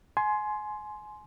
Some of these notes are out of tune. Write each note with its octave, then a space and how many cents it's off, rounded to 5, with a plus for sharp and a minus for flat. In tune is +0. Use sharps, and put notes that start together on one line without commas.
G#5 +25 C6 +0